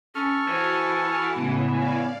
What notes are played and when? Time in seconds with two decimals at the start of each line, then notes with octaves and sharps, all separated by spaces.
0.15 C#4 A4 C#6 F6
0.48 E3 F#4 C5 A5
1.34 A2 C#3 G#3 B3
1.73 C#4 D5 F5